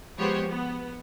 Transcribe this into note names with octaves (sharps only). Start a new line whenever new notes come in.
F3 G#3 B3 G4 C5 C#5
B3